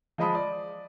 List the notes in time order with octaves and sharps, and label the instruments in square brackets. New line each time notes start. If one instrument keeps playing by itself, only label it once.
[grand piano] F3 G#3 D#5 A5 B5 D#6
D5